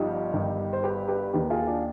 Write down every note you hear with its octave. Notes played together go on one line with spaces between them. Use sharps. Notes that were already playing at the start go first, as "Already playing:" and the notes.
Already playing: G1 G2 F3 D#4 G4
G1 G2 D#3
C5
G4 B4
G4 B4
D#2 D#3 G4 B4
F4 G#4
D4 F4